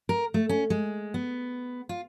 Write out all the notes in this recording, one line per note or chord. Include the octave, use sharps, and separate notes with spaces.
A#4
A3
C#4
G#3
B3
F4